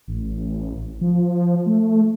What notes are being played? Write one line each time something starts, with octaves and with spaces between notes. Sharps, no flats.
A1
F3
A3